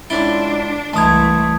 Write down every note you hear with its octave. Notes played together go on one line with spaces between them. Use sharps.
C#2 G#2 D4 E4 A6 D7 G7
C2 E3 G#3 A3 A5 A#5 D#6 G#6